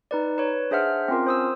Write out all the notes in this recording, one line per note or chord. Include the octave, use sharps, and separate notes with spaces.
D#4 B4 D5
B4 C#5
D4 G#4 C5 E5 F#5 F6
C4 C#4 F4 A#4
C5 D#6 E6